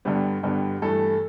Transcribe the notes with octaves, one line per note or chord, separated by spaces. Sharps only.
G2 D3 G3 B3
G2 D3 G3 B3
G2 E3 A3 A4